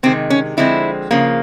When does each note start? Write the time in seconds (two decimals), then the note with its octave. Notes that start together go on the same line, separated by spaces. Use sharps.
0.03 C3 D#3 G#3 C4
0.30 C#4
0.57 D3 F3 G#3 C4 E4
1.11 C#3 F3 A#3